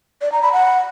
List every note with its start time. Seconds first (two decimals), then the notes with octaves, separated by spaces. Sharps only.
0.22 D5
0.32 A#5
0.42 B5
0.52 F#5